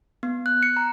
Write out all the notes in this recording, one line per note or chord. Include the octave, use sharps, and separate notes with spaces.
B3
F#6
C#7
A#5